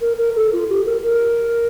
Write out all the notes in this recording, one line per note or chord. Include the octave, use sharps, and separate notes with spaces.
A#4
A#4
A4
F4
G4
A#4
A#4